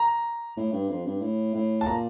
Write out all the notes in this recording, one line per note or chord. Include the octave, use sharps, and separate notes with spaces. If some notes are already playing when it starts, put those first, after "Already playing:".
Already playing: A#5
A2
G2
F2
G2
A2
A2
A5
A#2 A#5